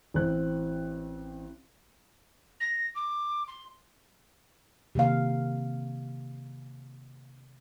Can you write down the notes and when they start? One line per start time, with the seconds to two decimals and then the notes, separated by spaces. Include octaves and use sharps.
0.14 A1 C4 F#6
2.60 A#6
2.95 D6
3.48 C6
4.95 C3 D#3 A#3 F5